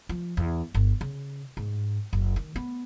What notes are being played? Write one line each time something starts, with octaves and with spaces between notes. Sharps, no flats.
F3
E2
G1
C#3
G#2
F#1
D#3
B3